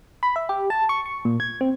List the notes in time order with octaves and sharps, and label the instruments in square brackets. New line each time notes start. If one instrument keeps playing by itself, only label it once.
[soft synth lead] B5
E5
G4
A5
C#6
C#6
A#2
G#6
C4